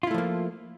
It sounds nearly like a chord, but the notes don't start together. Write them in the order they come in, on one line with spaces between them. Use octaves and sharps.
F4 E4 A3 F3 A#3